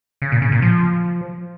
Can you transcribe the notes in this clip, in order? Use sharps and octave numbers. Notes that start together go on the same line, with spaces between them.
C#3
A#2
C#3
A#2
F3